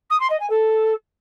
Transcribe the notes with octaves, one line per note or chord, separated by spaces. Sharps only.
D#6
C6
D#5
G#5
A4